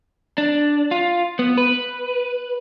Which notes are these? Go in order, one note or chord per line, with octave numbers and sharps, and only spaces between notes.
D4
F4
B3
B4